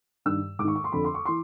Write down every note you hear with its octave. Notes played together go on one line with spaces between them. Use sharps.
G2 D#3 E6
G#2 D6
D#3 C#6
C#6
C6
F2 D3 B5
C6
C#6
E3 C6